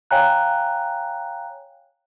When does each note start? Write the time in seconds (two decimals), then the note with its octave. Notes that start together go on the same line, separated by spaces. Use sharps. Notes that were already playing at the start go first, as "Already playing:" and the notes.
0.11 C#5 F5 G5 G#5 A#5 F#6